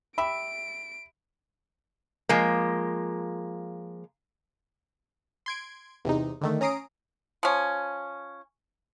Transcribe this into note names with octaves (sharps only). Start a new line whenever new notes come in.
G4 E5 B5 D7
F3 G#3 A#3
C6 G#6 D7
E2 C3 D#4
D3 D#3 A3
C#4 A#5 D#6 C7 D7
F3 C#4